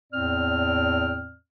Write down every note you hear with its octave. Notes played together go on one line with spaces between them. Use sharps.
E2 A2 C4 D5 F6